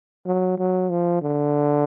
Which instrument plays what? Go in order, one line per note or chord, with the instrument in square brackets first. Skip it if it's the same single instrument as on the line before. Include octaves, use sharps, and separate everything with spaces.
[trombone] F#3
F#3
F3
D3